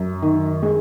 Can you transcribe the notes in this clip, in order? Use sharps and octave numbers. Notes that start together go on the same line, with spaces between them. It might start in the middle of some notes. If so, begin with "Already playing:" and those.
Already playing: F#2
D#3
G#3